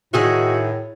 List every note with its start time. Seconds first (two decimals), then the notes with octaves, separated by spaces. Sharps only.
0.14 A2 D#3 F#4 G#4 E5